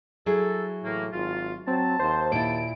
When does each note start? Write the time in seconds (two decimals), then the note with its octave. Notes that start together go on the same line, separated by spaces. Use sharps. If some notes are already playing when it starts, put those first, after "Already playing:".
0.26 F#3 E4 G#4 A4
0.83 A2 E3 A3 A#3
1.13 G#1 F4
1.67 F#3 C4 A5
1.99 D#2 C5
2.32 A#2 E4 D7